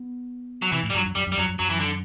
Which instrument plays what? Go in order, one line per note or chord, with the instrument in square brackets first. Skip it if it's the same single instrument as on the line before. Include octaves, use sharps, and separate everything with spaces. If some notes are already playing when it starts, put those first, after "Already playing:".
Already playing: [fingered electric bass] B3
[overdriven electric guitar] F#3
[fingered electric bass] C3 [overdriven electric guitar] E3
[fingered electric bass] A2
[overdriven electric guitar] G3
[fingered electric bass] G2 [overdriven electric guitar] F#3
[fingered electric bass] F#2
[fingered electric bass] F#2 [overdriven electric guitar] G3
[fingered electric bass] F#2
[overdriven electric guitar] G3
[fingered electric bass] F#2 [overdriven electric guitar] F#3
[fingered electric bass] F#2
[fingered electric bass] F#2 [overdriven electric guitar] F#3
[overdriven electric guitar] E3
D3